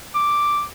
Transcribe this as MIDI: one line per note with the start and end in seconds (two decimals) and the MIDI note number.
0.15 0.63 86